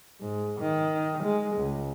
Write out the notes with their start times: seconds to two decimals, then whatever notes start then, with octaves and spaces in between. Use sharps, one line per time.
0.21 G#2
0.60 D#3
1.24 G#3
1.57 C#2